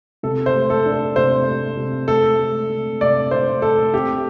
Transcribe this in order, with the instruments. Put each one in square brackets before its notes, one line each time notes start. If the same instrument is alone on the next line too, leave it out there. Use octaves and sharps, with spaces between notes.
[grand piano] C3 [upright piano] A4
[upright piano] C5
[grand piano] A3
[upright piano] A4
[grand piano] D4
[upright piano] A4
[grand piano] C3 [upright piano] C5
[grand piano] A3
C3
[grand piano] A3 [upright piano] A4
[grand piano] A3
C3
[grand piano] C3 [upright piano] D5
[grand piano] D4 [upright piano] C5
[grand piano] A3 [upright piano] A4
[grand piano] C4 [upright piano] G4